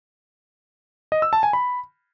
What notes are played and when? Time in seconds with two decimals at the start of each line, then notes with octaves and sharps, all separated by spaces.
1.12 D#5
1.22 E6
1.33 A5
1.43 G#5
1.53 B5